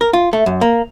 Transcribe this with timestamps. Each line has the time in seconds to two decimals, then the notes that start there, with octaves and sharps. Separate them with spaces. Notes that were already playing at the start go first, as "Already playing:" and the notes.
0.01 A#4
0.13 F4
0.33 A3
0.46 F#2
0.61 A#3